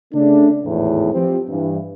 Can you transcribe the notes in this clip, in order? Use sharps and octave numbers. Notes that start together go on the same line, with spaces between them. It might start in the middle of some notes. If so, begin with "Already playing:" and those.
C#3 A3 D4
G#1 E2 A2
F3 C4 G4
G2 E3